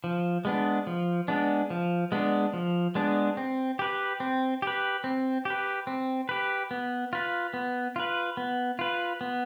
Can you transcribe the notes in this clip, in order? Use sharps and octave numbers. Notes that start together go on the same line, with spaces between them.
F3
G#3 B3 D4
F3
G#3 B3 D4
F3
G#3 B3 D4
F3
G#3 B3 D4
C4
G4 B4
C4
G4 B4
C4
G4 B4
C4
G4 B4
B3
F4 B4
B3
F4 B4
B3
F4 B4
B3